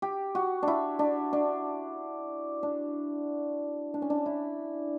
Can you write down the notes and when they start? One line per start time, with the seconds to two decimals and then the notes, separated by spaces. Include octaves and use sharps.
0.02 G4
0.35 F#4
0.63 D4 E4
0.99 D4
1.33 D4
2.63 D4
3.94 D4
4.02 C#4
4.10 D4
4.26 E4